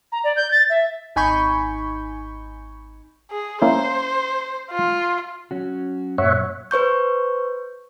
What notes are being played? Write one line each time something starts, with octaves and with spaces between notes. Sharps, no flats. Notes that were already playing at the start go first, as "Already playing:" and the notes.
A#5
D5
G6
A6
E5
G#1 D#4 G#5 B5 C#6 G6
G#4
A#3 C#4 E4 C5
F4
F#3 C#4 F#4
F#2 A#2 C#5 E5 F#5
B4 C5 C#6 G6